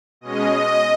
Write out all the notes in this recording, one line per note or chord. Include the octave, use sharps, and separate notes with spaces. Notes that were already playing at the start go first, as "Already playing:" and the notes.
B2 G#3 C#4 D#5
D#5